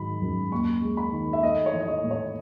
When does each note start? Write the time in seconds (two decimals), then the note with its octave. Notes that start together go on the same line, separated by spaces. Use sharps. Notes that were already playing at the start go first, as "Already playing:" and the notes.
Already playing: G#2 D#3 F#3 B5
0.21 F#2
0.51 D#2 C#6
0.82 G#3
0.97 B5
1.12 D#3
1.33 E5
1.43 A3 D#5
1.66 C#5
1.73 E3
1.80 D#5
1.88 C#5
2.04 A2
2.11 C#5